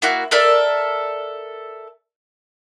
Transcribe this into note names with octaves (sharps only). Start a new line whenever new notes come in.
A#3 E4 F#4
A4 A#4 D5 E5